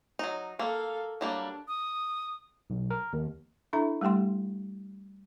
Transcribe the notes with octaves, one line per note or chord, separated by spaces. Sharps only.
F#3 D#4
A#3 A4 F5
F#3 G3 A#3 D4
D#6
B1
A#4
D#2
D4 E4 A4 E5 A#5
G3 A3 G4 G5 C6